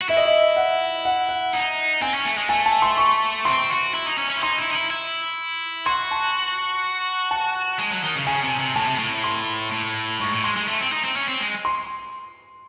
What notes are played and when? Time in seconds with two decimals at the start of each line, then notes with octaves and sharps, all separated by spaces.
0.01 F#4
0.09 E4 E5
0.17 D#5
0.25 E5
0.56 F#5
1.05 F#5
1.29 F#5
1.53 D#4
2.02 C4 G#5
2.14 C#4
2.25 A3
2.37 G#3
2.49 A3 G#5
2.66 A5
2.82 C6
2.97 C#6
3.45 C4 C6
3.70 F#4
3.94 E4
4.06 D#4
4.18 C#4
4.30 C#4
4.37 E4
4.43 D#4 C6
4.58 E4
4.70 D#4
4.75 E4
4.90 E4
5.86 F#4 C6
6.11 A5
7.31 A5
7.79 G#3
7.91 F#3
8.04 D#3
8.16 C#3
8.27 C#3 G#5
8.44 C3
8.59 C3
8.75 A2 A5
8.87 C3
8.99 A2
9.24 C6
9.72 A2
10.20 G#2 C#6
10.32 A2
10.44 G#3 C6
10.56 G#3
10.68 A3
10.80 C4
10.92 D#4
11.04 C4
11.16 C#4
11.28 C4
11.40 G#3
11.65 C6